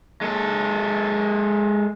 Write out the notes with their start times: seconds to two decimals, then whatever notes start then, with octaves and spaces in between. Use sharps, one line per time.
0.21 G#3 A4